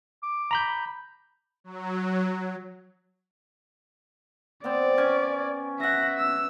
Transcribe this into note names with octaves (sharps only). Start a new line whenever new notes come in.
D6
A#5 B5 G6
F#3
B3 C4 D5
C#4 G#5
B4 E5 F#5 A#6
E6